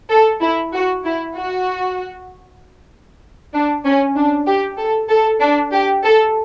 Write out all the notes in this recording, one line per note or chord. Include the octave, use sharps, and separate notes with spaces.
A4
E4
F#4
E4
F#4
D4
C#4
D4
G4
A4
A4
D4
G4
A4